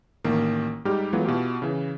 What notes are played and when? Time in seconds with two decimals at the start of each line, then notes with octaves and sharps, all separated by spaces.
0.24 A1 D#3 A#3
0.85 G#2 G3 D#4 G4 F6
1.13 E3 F#3 G#3 A3 B3 F4
1.25 B2 E4 F4 G4
1.62 C#3 E3